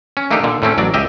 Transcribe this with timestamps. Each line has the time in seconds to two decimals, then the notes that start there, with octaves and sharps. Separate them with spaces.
0.17 C#4
0.31 A3 A#3 D4 D#4 G4
0.43 A#2 D3
0.62 A2 A3 C4 C#4
0.78 A1 F#3 D5
0.94 C#2 G4 D#5 E5